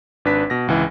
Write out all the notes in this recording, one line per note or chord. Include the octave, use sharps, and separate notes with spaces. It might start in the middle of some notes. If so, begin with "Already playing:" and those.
G#1 D4 B4 B6
B2 A#6
G#1 C#2 E3